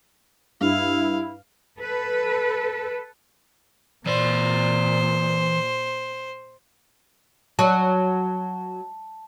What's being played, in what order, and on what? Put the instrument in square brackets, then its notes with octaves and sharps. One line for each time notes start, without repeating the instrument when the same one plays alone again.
[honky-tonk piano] G2 [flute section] E4 [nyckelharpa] F5
[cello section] A4 B4
[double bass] A#2 [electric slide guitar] E3 D5 [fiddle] C5
[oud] F#3 [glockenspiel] A5